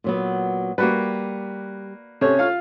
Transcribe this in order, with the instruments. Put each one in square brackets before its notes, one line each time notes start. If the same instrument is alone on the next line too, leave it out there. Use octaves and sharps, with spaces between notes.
[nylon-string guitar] A#2 F#3 B3
[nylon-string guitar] G3 [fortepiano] A#3 F#4 B4
[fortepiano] C3 C#4 [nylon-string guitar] A4 C#5
[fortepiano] F4 F5